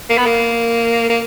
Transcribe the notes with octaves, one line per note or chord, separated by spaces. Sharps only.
A#3
B3
A#3
A#3